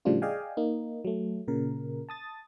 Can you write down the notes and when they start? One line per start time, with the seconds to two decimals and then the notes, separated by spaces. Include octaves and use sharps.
0.05 A2 C#3 F3 G3 D4 F4
0.22 G#4 D5 D#5 F5 G5 G#5
0.57 A#3 D#4
1.05 F#3 A3
1.48 A#2 C#3 A#4
2.09 A5 D#6 A6